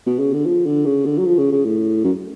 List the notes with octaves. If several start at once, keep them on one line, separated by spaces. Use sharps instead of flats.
B2
C#3
D3
F3
D3
C#3
D3
F#3
F3
C#3
C#3
A2
F#2